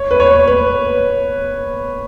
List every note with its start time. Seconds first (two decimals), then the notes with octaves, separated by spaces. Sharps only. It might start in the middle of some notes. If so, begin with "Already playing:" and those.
Already playing: C#5
0.11 B4
0.20 C#5
0.47 B4